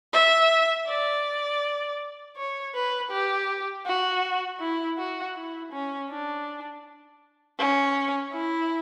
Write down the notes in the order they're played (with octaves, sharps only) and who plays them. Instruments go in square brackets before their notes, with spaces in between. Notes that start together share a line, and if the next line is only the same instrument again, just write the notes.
[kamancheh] E5
D5
C#5
B4
G4
F#4
E4
F#4
E4
C#4
D4
C#4
E4